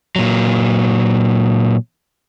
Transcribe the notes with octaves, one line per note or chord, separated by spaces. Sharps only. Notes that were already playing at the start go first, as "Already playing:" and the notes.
A#2 F#3